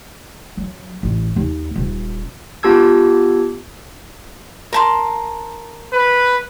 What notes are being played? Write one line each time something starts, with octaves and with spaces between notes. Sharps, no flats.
F#3
A1
D#2
D#1
B3 F4 G4 A5 E6 G#6
A#4 A5 C6
B4